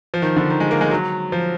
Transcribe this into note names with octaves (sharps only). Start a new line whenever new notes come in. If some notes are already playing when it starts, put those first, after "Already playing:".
F3
D#3
D3
D#3
G#3
A#3
G#3
F#3
F3